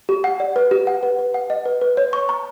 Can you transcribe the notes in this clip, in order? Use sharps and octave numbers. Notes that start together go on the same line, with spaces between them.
G4
F#5
D5
B4
G4
F#5
B4
B4
F#5
D#5
B4
B4
C#5
C#6
A#5